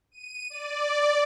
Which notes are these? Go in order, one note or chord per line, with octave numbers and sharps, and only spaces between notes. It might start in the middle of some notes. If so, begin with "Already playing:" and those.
D#7
D5